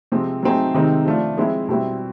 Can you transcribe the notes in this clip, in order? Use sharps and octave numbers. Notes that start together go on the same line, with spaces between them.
C3 F3 G#3 C4
F#3 A3 C4 D#4 G#4
C3 D#3 G#3 C4 D#4
F3 A3 D4 F4
F3 G#3 C4 E4
B2 G3 C4 E4